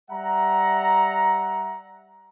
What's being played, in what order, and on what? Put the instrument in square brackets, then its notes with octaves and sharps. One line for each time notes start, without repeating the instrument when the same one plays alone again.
[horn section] G3 E5 F#5 A#5